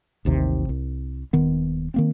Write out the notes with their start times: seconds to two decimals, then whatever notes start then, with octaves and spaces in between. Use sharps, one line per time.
0.25 A1 D#2 C3
0.69 C2
1.33 D#1 D#3 B3
1.94 D#3 A#3 C4